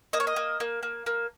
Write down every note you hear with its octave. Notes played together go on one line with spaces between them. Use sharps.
A#3 D#5
C#5
D#5
A#3
A#3
A#3
A#3